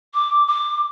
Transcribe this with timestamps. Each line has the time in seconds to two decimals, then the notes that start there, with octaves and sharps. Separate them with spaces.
0.14 D6
0.48 D6